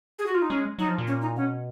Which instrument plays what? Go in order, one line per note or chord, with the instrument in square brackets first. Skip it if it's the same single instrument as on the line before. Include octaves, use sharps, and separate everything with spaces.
[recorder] G#4
F#4
F4
D#4
[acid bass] G#3 [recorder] C#4
[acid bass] F#3 [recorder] D#4
[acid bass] F3
A#2
[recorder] C#4
D#4
[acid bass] B2 [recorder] C#4